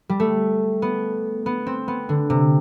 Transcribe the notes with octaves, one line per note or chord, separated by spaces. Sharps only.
G3
A3
B3
B3
C4
B3
D3
C3